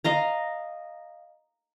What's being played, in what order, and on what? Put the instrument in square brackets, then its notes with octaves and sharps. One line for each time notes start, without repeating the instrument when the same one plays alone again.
[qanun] D#5 F5 A#5